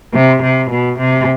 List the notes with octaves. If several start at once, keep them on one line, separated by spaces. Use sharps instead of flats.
C3
C3
B2
C3